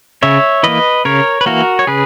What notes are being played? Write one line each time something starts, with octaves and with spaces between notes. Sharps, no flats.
C#3 C#5 E5
E3 A#3 B4 D#5
C#3 A#4 C#5
B4
E3 A#3 F#4 A#4
C#5
C#3 G#4 B4